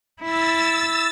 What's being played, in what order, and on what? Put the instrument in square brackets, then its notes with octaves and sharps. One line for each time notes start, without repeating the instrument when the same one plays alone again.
[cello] E4 [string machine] E6 A6